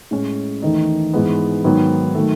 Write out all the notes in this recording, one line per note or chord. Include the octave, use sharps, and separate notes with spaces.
A2 G#3 C#4
E2 D#3 A3 D#4
G#2 E3 G#3 B3
G#2 D#3 F#3 B3
D#3 F#3 A3